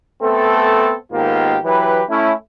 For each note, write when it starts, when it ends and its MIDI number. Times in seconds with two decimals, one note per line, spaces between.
0.22 0.94 57
0.22 0.94 59
0.22 0.94 60
0.22 0.94 69
1.12 1.57 44
1.12 1.57 51
1.12 1.57 58
1.12 1.57 59
1.12 1.57 65
1.12 1.57 67
1.64 2.02 52
1.64 2.02 54
1.64 2.02 67
1.64 2.02 71
2.09 2.32 57
2.09 2.32 61
2.09 2.32 64